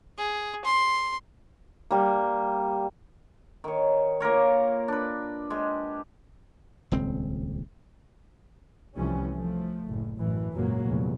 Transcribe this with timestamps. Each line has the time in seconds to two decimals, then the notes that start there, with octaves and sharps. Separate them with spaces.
0.18 G#4
0.65 C6
1.91 G3 A#3
3.64 D#3 C#5
4.20 A#3 F4 A#4 C#5
4.88 D4 B4
5.50 G#3 G4
6.92 D#1 C#2 C4
8.94 C2 E3 F3 G3 A3 C#4
9.33 F3 A3
9.88 F#1 A2
10.18 A1 F#2 A2 E3
10.53 G#1 C#2 F#2 A#2 F#3 A#3
10.85 F1 E2